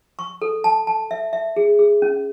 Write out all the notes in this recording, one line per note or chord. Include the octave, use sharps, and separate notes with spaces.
C#6
A4
A5
A5
E5
E5
G#4
G#4
C#4